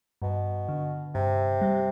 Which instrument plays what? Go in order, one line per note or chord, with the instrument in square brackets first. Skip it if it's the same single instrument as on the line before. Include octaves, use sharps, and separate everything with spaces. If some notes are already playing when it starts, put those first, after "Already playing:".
[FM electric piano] G2 [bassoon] B2
[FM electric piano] D3
[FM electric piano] G2 [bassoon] C3
[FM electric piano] G3